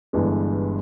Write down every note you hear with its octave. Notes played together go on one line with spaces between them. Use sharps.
G1 G2 E3 G#3